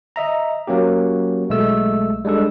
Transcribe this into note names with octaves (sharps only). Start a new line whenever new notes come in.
D#5 E5 A#5
F#3 A#3 C#4 G4
B1 G#3 A3 E6
G3 G#3 D4 A4